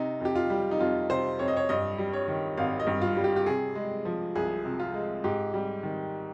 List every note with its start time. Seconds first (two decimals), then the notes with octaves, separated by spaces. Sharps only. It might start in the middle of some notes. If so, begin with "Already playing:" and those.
Already playing: C3 D#4
0.20 F2 G4
0.35 F4
0.50 G3
0.71 D#4
0.80 F2 F4
1.09 C3 C5
1.39 F2 C#5
1.48 D#5
1.57 C#5
1.69 G2 D#5
1.98 G3
2.13 C#5
2.28 D#3
2.57 G#1 F5
2.80 D#5
2.87 G2
3.01 F4
3.17 G3
3.24 G4
3.36 G4
3.46 C3 G#4
3.75 G#3
4.05 F3
4.35 C2 G#4
4.65 C3
4.79 F4
4.94 G#3
5.24 G#2 G4
5.54 G3
5.83 D#3